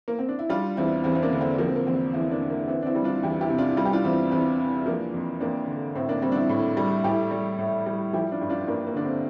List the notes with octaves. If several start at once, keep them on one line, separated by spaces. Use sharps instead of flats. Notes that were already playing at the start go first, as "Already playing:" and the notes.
A#3
C4
D4
E4
G3 D4 F4
E2 C4 E4
E2 C4
C4
A#3 D4
D3
C4
F3 A#3
C4
A#3
E2 C4
E2 C4 E4
A#3 D4
D3
A#3
E3 C4
D4
C4 E4
G3
D4 F4
E2 E4 G4
E4 G4
C3
D4 F4
G3 F4
G4
D4 F4
E2 C4 E4
E2 C4 E4
E3
F3 A#3 D4
F2
F2 A#3 D4
D3
A2 C4
A#3 D4
G3 C4
D4
C4 E4
A2
G3
A2 E4 G4
G3
A2
G3
F3 E4 G4
D4 F4
G2
D4 F4
G2 A#3 D4
A#3
D3 D4
C4